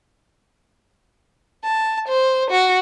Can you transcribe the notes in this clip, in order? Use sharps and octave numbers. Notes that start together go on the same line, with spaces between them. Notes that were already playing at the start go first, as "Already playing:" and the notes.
A5
C5
F#4